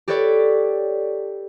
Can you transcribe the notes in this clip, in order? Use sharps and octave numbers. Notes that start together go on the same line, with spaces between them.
G4 A4 B4 C#5 D5